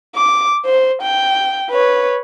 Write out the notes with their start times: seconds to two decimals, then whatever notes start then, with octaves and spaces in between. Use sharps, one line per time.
0.15 D6
0.65 C5
1.02 G5
1.70 B4 C#5